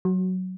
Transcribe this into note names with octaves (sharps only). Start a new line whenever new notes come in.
F#3